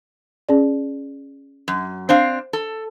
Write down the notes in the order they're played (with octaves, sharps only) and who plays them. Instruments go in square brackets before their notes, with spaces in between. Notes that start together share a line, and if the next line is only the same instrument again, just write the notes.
[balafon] C#4 G#4 D5
[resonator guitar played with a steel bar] F#2
[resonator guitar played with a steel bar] C4 D4 F5 [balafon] C5
[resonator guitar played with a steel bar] A4